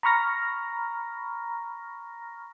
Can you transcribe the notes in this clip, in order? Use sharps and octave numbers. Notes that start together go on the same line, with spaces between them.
A#5 B5 C#6 F6 A#6